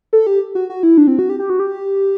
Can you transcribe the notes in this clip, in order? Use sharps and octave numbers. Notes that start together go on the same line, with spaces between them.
A4
G4
F#4
F#4
E4
D4
C4
F#4
G4
G4
F#4
G4